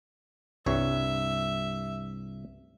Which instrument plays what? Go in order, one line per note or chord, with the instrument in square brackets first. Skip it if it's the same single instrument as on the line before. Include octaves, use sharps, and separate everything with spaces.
[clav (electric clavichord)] C2 G2 C#5 [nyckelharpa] E5